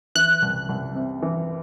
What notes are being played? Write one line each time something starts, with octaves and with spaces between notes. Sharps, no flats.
E3 F#6
C2
C2
C3
E3